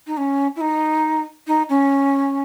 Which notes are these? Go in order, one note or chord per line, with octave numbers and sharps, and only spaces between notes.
D#4
C#4
E4
D#4
D#4
C#4